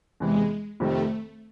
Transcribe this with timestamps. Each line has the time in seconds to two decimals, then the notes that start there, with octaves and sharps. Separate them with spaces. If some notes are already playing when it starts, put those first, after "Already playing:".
0.20 E2 C3 E3 G#3
0.80 F1 F2 C3 D#3 G3 A3